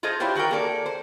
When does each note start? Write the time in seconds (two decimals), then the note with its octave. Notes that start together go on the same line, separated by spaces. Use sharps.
0.03 F4 G#4 A4 C5 D#5
0.20 D4 E4 F4 G4 C5 C#5
0.35 D#3 F#4 A4 A#4 G5
0.51 A#3 G#4 A4 D5
0.86 C5